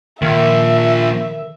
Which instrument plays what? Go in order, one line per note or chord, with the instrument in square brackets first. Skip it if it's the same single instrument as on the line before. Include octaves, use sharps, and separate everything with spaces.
[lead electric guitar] A#2 F3 [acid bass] D#3 [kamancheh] E5